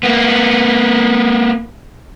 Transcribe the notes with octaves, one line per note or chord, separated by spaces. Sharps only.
A#3 B3